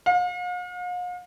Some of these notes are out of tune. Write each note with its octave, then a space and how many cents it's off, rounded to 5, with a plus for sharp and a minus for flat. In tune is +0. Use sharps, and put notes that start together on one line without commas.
F5 +45